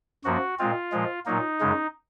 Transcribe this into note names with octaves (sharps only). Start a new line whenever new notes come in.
F#2 F3 A#3 F#4
A#2 G#3 C4 F4
A#2 F3 G#3
A#2 F#3 A#3 D#4
F#2 C#3 G#3